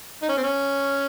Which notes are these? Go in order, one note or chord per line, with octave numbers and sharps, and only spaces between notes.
D#4
C#4
C4
C#4